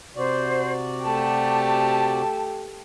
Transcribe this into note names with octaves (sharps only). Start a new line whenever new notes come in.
C3 F#4 C5 D5
A3 G4 A5